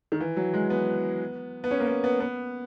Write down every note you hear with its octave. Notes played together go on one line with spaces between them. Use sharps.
D#3
E3
F#3
G#3
B3
B3
C#4
A#3
B3
B3
B3